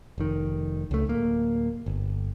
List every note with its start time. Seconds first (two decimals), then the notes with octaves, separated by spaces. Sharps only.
0.18 F1 D#3
0.91 C#2 A3
1.07 D1 A#3
1.86 G1